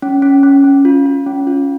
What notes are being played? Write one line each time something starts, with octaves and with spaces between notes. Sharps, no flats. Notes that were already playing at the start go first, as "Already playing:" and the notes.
C#4
C#4
C#4
C#4
F4
F4
C#4
F4